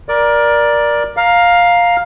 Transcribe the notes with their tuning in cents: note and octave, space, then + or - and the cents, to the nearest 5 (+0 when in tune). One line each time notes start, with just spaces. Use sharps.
A#4 +20 D5 +0
F5 +10 A#5 +0